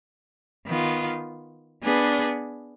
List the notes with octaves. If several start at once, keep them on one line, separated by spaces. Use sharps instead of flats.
D#3 B3 F4
B3 D4 G#4 B4